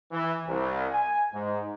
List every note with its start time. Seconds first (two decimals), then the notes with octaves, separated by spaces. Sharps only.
0.12 E3
0.48 C2
0.91 G#5
1.33 G#2